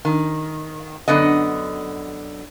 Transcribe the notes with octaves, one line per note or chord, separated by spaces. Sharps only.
D#3
F#2 D3 B3 D#5